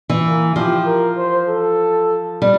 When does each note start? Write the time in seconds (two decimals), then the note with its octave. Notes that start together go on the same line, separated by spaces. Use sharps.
0.09 E3
0.25 A#3
0.56 F3 G4
0.86 A#4
1.18 C5
1.49 A4
2.42 G3